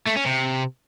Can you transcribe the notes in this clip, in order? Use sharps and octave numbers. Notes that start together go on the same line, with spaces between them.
A3
C#4
C3